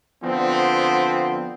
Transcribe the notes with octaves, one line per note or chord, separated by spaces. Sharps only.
D3 F3 B3 C4